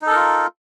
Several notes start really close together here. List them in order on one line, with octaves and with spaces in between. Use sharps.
D#4 A4 A#4 F4